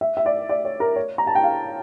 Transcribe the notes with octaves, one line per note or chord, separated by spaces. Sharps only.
E5
E5
D5
D5
C#5
A#4
C#5
A#5
A5
G5
F5